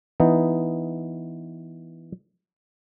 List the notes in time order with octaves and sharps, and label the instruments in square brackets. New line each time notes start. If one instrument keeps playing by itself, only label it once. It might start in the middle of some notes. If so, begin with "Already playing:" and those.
[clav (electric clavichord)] E3 B3 D#4